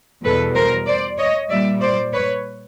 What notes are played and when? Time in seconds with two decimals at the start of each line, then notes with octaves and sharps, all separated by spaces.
0.24 E2 B2 G3 A4 B4
0.55 A#4 C5
0.87 C5 D5
1.18 C#5 D#5
1.50 A#2 G3 D5 E5
1.81 C5 D5
2.13 B4 C#5